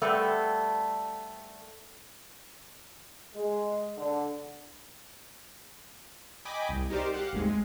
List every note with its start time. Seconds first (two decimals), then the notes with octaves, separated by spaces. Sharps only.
0.02 G3 A3 B3 C4 A4
3.34 G#3
3.98 D3
6.45 D#5 G5 G#5 B5 D6
6.69 C2
6.90 D#4 G4 A#4 C5 D5
7.14 G4 F5 F#5
7.33 G#1 D#2 C3 G#3
7.48 G#3